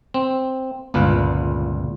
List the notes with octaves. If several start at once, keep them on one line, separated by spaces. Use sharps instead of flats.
C4
G1 C#2 A#2 B4